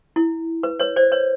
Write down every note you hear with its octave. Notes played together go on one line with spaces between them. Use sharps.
E4
B4
B4 C#5
C5 D5
B4 C#5